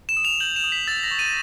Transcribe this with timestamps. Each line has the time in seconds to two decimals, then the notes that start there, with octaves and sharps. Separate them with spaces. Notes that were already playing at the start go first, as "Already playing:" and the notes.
0.09 E7
0.17 D#6
0.25 F7
0.40 G6 F#7
0.56 E7
0.64 D#6
0.72 B6
0.87 E6 A6
1.03 A#6
1.11 C#6
1.19 D#7